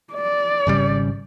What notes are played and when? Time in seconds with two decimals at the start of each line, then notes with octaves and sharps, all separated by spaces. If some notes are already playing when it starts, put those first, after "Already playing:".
0.14 D5
0.67 G#1 C#3 G3